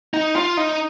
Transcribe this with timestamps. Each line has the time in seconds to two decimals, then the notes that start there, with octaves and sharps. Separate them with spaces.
0.14 D#4
0.36 F4
0.57 D#4